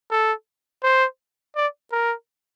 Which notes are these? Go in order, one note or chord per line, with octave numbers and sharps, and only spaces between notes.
A4
C5
D5
A#4